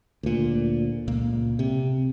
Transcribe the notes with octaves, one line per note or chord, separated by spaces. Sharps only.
D2 A#2
C#2 A#2 A#3
C3